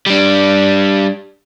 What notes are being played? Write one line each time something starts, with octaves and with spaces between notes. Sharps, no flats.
G3 D4